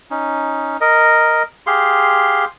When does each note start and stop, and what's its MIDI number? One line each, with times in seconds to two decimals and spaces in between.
0.11 0.77 61
0.11 0.77 63
0.81 1.43 70
0.81 1.43 75
1.67 2.45 67
1.67 2.45 68
1.67 2.45 77
1.67 2.45 84